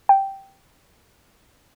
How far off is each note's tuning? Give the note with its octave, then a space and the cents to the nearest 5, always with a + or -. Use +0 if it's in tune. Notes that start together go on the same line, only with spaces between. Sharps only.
G5 -5